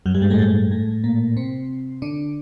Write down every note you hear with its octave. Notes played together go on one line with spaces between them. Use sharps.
F#2 F#3
G2 G3
G#2 G#3
A2 A3
G#2 G#3
A2 A3
A#2 A#3
C3 C4
D3 D4